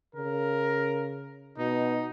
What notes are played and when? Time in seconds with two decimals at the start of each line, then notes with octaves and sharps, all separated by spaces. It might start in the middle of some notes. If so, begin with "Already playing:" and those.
0.15 C#3 A#4
1.58 B2 D#4